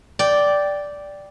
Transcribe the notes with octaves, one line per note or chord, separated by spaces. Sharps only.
D5 G5